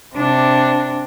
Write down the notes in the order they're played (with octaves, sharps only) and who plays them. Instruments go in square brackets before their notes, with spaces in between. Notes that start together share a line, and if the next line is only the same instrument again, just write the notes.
[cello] C3 D4